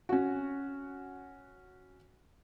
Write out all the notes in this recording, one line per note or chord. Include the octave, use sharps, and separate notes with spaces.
C#4 F#4